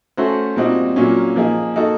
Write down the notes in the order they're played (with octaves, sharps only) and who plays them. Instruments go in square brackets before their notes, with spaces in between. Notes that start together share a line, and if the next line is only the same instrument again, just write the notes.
[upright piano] A3 C#4 F#4 A4 C5
A#2 G3 C4 D#4 F#4
A#2 F#3 A#3 C#4
F3 A#3 D#4 G#4
A#3 D#4 F#4 A4